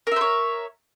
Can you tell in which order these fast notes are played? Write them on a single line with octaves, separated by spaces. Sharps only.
A#4 E5 C5 C#5